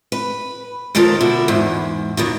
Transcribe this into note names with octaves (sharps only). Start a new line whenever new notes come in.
B4
D#2 F3 G#3 A4 A#4
B2 D3 E4
E2 G#2
D#2 B2 D#3